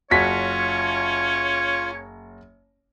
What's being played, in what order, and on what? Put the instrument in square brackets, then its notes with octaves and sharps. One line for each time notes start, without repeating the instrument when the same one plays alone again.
[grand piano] F#1 F#4 B6 [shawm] C#4 [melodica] F4 [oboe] C#5